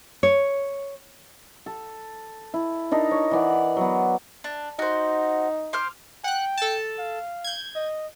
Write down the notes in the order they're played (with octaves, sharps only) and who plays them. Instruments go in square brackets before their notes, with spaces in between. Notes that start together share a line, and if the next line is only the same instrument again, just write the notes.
[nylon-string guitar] C#5
[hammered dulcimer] A4
E4
D4 D#4 A#4
C#5
E3 D5 F#5
F#3 B3
[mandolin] D4
[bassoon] D#4 [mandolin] F#4 C5
[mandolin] C5 D6 F6
[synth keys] F#5 F#6 [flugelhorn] G5
[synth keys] A4 A5
[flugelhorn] F5
[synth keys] G6 G#6
[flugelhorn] D#5